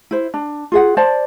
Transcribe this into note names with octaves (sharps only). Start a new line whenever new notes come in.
E4 C5
D4
F4 G#4 F#5
C5 D5 A5